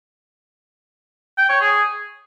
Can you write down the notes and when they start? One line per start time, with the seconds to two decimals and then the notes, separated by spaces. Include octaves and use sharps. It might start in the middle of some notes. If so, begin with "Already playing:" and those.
1.38 G5
1.49 C#5
1.61 G#4